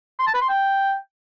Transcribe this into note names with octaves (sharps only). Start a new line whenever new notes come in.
C6
A5
B4
C6
G5